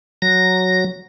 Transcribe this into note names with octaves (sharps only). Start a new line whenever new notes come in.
F#3 A#6